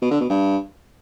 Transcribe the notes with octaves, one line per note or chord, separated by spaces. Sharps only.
B2
D3
B2
G2